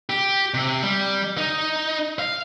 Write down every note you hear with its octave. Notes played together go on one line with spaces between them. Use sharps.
G4
C3
G3
D#4
F5